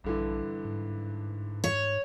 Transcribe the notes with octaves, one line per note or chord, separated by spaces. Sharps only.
A#1 G2 D3 E3
G#2
C#5